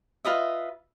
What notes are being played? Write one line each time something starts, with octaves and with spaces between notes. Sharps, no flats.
F4 B4 D#5 E5